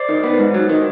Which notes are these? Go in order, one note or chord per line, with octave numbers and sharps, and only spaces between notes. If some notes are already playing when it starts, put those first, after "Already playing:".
Already playing: C5 D5
D#3
B3
G#2
F#3
D#3